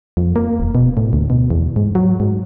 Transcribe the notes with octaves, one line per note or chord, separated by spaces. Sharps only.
F2
A#3
D#1
B2
A2
D2
B2
E2
G#2
F#3
G#2